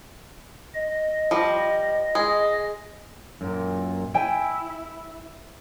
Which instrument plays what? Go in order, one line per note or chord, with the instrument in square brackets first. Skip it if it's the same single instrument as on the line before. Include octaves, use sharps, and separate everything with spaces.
[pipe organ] D#5
[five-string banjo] F3 G3
G#3
[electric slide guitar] F#2 A#2
[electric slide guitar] E4 [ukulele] G5 G#5